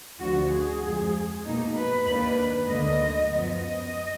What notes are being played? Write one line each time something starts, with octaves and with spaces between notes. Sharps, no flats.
D2 D3 F3 F#4
G#4
F2 F3 G#3
B2 A#3 D#4
B4
D#2 D#3 A#3 D4 B4
D2 D3 F#3 A#3 D#5
F#2 F3 B3
D#5